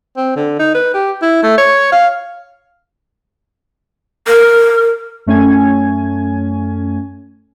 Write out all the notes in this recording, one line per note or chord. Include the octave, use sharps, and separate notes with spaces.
C4
D3
D#4
B4
G4
E4
A3
C#5
F5
A#4
F#2 A3 C#4 G#5 G#6